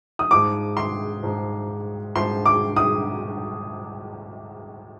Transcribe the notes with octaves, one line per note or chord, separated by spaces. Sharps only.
D#6
G#2 F3 D6
C6
G#2 F3
G#2 F3 C6
D6
D#6